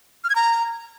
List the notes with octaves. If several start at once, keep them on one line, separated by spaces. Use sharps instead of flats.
F6
G#6
A#5